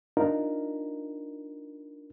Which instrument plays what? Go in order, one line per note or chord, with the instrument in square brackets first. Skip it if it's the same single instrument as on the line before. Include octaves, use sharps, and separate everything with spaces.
[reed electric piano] D4 D#4 F4 A#4